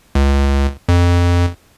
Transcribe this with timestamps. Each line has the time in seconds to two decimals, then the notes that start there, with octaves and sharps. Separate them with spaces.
0.15 C#2
0.89 F2